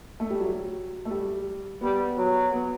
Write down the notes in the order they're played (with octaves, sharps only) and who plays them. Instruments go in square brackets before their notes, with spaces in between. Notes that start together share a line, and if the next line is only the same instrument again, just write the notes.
[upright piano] A3
G3
F#3
A3
G3
[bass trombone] G3 [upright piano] B3
[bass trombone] F#3
[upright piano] B3